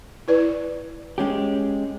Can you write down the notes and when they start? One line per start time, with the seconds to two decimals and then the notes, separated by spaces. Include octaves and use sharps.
0.28 E4 B4 D5
1.18 G#3 C#4 G4